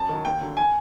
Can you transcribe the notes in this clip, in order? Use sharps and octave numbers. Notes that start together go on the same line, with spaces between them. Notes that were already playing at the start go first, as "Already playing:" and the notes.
Already playing: F#2 A5
D#3 F#3
D#2 G5
D3 F#3
G#5